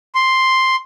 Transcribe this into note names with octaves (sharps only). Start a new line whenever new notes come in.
C6